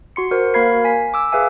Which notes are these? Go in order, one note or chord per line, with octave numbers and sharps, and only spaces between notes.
F#4 C6 C#7
F#4 A#4 C5
A#3 A#4 F5 B5 G#6 C7
G#5 B6
D6 E6
G#4 B4 E5 F5 G#5